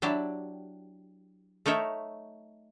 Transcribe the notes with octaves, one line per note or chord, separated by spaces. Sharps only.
F#3 D4 E4 G4
A3 D#4 A#4 C#5 E5